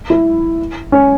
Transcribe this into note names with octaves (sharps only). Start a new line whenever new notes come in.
E4
C#4